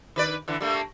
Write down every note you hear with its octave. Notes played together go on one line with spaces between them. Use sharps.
D#3 B4 D5
D3 E3
G3 A3 A#3